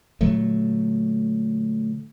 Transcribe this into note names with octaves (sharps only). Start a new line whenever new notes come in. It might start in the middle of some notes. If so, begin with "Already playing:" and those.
A#2 D3 F#3 A3